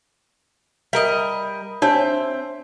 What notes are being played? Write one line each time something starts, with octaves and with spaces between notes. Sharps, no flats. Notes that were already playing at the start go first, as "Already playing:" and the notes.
G3 A#4 D#5 E5
C4 D4 C#5 E5 A5